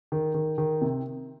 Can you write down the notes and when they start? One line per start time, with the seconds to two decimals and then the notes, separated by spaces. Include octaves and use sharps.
0.12 D#3
0.34 D#3
0.58 D#3
0.81 C3